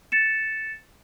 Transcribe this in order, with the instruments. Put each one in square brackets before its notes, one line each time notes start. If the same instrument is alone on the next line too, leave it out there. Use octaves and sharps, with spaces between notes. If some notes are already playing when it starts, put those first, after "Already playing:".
[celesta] A6 C#7 E7